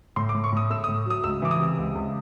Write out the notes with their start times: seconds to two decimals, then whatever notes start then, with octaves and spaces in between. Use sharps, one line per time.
0.16 A2 C6
0.29 D6
0.34 A2
0.44 C#6
0.52 A2 D#6
0.70 A3 E6
0.84 D#6
0.88 A2
1.06 F#3 D#6
1.23 C#2 E6
1.42 E3 D6
1.51 D#6
1.60 C3
1.78 C#2
1.95 C#2